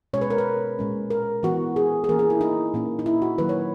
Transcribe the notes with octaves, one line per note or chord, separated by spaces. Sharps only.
B2 G#3 C#4 C#5
B4
A#4
B4
A#2 G#3 C#4
A#4
E3 B3 F#4
G#4
G#4
E3 A#3 C#4 A#4
G#4
E4
D#4
A#2 A#3 C#4
D#4
E4
F#4
D#3 F#3 A#3 B4
C#5